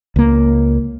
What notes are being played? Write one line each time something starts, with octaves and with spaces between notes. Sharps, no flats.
C#2 A#3